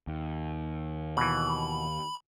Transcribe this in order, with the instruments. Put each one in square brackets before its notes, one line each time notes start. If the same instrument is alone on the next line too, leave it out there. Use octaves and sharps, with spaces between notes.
[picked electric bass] D#2
[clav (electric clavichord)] B2 E3 [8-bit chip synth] B5